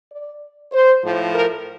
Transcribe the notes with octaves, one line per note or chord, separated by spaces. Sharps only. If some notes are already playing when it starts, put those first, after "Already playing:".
D5
C5
A2 F3
A#4